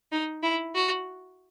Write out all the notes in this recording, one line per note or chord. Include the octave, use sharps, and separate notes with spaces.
D#4
E4
F#4